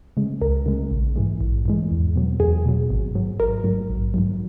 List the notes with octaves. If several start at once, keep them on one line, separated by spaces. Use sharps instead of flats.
C#3 G#3
C#2 A#4
C#3 G#3
A#1
G#2 E3 G#3
A#1
G#2 E3 G#3
E2
B2 F#3
E2 G#4
B2 F#3
G#1
G#2 F#3
G#1 A#4
G#2 F#3
A#1
G#2 D#3 F#3